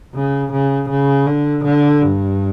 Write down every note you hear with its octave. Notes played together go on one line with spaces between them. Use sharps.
C#3
C#3
C#3
D3
D3
G2